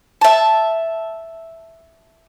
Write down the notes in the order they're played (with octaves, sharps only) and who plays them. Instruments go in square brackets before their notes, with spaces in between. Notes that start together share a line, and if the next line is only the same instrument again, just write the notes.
[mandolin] E5 A5